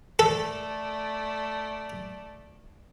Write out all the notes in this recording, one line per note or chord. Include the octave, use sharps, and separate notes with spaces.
A3 A4 D5